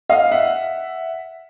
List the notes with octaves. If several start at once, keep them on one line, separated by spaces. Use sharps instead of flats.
D#5 F5
E5 F#5